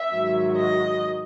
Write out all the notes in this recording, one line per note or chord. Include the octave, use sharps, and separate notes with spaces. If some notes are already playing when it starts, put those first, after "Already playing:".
Already playing: E5
G#2 D#3 F#3
D#5